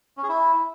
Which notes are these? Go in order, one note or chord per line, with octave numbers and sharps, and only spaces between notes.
C#4
G#4
E4